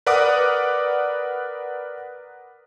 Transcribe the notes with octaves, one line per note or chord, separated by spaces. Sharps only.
A#4 B4 D5 F#5 D6 D#6